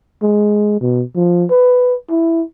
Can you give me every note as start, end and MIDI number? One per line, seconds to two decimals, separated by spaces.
0.23 0.79 56
0.81 1.02 47
1.16 1.45 53
1.50 1.94 71
2.10 2.42 64